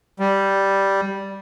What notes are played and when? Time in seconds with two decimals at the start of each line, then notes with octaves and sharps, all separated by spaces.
0.20 G3